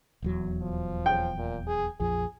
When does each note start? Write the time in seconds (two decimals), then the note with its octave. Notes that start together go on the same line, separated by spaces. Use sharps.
0.22 D#1 E2 F#3
0.62 F3
1.06 G5
1.38 A#2
1.67 G#4
2.00 A#1 F2 F3 G#4